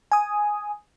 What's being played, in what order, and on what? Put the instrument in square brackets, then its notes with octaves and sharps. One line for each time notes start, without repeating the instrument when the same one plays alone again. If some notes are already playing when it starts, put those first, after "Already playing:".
[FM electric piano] G#5 D#6